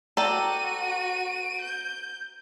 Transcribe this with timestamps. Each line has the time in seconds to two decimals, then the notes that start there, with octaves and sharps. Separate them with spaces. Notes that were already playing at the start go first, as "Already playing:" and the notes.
0.17 F#4 A4 D5 G5 A#5 D#7
1.62 G6